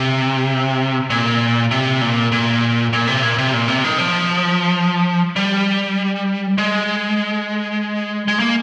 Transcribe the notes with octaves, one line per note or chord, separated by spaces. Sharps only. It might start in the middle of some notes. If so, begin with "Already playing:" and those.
Already playing: C3
A#2
C3
A#2
A#2
A#2
C3
A#2
C3
A#2
C3
D#3
F3
G3
G#3
G#3
A#3